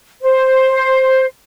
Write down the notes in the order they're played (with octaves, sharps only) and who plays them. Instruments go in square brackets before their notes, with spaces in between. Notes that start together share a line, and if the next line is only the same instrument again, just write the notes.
[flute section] C5